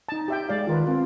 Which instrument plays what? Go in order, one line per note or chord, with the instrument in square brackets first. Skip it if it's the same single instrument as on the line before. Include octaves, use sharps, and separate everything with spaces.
[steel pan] D#4 A5
G4 E5 G5
G#3 D5 F5
[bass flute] D#3 [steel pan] F4 A#4 B4
[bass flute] C4 [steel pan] F4